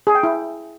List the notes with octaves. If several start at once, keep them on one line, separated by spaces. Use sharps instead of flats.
G#4
G5
E4